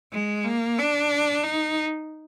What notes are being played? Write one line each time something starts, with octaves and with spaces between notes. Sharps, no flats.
G#3
A#3
D4
D#4